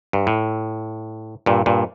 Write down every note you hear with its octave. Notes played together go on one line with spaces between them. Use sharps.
G2
A2
G2 A#2
G2 A#2